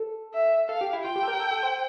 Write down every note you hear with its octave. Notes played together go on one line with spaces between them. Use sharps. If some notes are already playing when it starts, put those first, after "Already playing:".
Already playing: A4
E5
A4 F5
G4
E4
F4 G5
G4
A4
A#4
A4
A4
C5